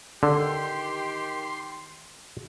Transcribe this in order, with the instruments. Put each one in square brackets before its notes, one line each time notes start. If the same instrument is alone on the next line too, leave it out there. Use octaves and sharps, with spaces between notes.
[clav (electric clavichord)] D3 [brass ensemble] D#3 G4 [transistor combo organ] C6